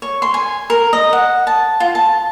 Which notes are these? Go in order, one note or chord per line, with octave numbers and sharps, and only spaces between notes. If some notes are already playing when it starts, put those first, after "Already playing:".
C#5
C6
G#5
A#4
D#5
F#5
A5
F4
A5